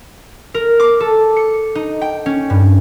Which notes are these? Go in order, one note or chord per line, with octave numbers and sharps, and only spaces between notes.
A#4
D6
A4
C#7
D#4
G5
C#4
G2